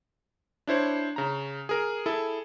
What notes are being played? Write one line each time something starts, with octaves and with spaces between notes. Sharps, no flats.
D4 E4 C5 C#5
C#3 A#5
G#4 A#4
E4 G#4 A4